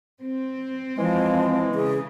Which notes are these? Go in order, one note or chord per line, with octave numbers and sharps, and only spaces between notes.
C4
E3 F3 G#3
C#3 G#4